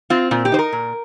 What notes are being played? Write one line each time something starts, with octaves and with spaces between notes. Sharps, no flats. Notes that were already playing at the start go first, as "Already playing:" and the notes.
C4 F4
A#2 F4
G4
D#4 C5
A#4
A#2